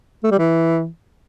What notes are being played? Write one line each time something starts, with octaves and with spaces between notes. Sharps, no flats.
A3
G3
E3